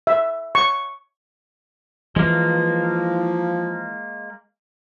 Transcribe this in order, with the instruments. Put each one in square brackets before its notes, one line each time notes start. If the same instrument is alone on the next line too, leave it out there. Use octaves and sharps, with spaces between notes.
[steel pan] E5
C#6
[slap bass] E3 [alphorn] F3 [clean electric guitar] G#3 A#3